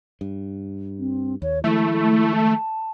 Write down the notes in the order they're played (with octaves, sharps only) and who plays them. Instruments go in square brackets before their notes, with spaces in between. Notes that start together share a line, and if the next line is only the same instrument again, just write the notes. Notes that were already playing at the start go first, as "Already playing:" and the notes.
[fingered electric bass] G2
[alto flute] C4
[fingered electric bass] D#2 [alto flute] C#5
[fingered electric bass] D#3 F3 G#3 [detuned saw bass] A3 [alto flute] E4
[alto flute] A5